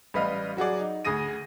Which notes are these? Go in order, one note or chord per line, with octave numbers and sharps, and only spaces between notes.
A1 G3 B4 D#5 F5
F#3 F#4 G#4 D5
D#4
D2 G#4 D#6 A#6 D#7